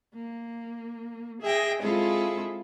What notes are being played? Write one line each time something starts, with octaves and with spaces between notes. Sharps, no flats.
A#3
G#4 E5 G5 A#6
G#3 C4 E4 F4 G#4 A4